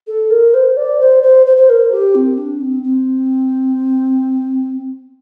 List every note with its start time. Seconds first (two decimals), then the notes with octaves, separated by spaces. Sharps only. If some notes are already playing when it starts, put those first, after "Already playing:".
0.07 A4
0.31 A#4
0.54 C5
0.77 D5
1.00 C5
1.23 C5
1.47 C5
1.57 C5
1.70 A#4
1.92 G4
2.15 C4
2.38 D4
2.61 C4
2.84 C4